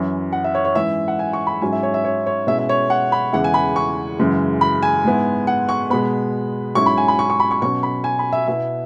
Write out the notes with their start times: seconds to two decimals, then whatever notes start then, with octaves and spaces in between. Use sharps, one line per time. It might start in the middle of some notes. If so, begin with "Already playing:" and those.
Already playing: F#2 E3 C#4 E4
0.32 F#5
0.44 E5
0.55 C#5
0.65 C#5
0.75 G#2 E3 G#3 C#4 E4 E5
1.08 F#5
1.19 G#5
1.33 C#6
1.47 B5
1.62 G#2 F#3 C#4 E4 G#5
1.73 E5
1.83 C#5
1.94 E5
2.05 C#5
2.27 C#5
2.47 B2 G#3 C#4 E4 E5
2.59 E5
2.69 C#5
2.90 F#5
3.12 B5
3.33 E2 C#3 E3 G#3 E4 F#5
3.44 G#5
3.54 B5
3.76 C#6
4.19 F#2 C#3 E3 G#3
4.61 B5
4.83 G#5
5.04 G#2 G#3 B3 E4
5.47 F#5
5.69 C#6
5.90 B2 G#3 B3 B5
6.75 G#2 F#3 C#4 E4 C#6
6.86 B5
6.98 G#5
7.08 B5
7.19 C#6
7.30 C#6
7.40 B5
7.51 C#6
7.62 B2 F#3 C#4 C#6
7.83 B5
8.04 G#5
8.19 B5
8.33 E5
8.48 B2 B3 E4 E5